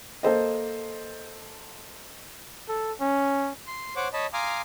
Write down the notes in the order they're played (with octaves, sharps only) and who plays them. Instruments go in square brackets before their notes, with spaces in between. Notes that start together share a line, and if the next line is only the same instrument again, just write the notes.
[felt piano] A#3 A4 C5 D#5
[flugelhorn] A4
C#4
[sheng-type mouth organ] C6
C5 C#5 F#5 D6
C#5 D#5 A5 B5
F5 G#5 A#5 C6 D6 D#6